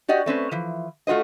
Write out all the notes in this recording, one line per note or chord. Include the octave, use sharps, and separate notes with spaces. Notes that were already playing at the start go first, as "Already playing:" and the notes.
F#4 G4 D5 D#5 F#5
A3 C4 C#4 B4
E3 F3
A3 F4 F#4 C5 D#5